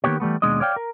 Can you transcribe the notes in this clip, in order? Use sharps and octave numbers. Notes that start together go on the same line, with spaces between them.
D#3 A#3 B3 G4 C#5
E3 G3 A3 B3
D#2 B2 G#3 D4 D#5
C#5 D5 F5 G5
A#4